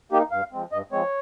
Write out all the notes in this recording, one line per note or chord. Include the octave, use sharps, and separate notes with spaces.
A#3 D#4 G4
G2 F5
F3 G#3 C4
G2 D#5
F3 G#3 C4 C#5